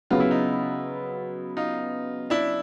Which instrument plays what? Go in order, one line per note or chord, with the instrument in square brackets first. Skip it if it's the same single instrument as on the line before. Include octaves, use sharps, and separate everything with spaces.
[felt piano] C#3 F#3 B3 [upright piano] F4
[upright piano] E4
D#4 F4
D#4 F4
D4 E4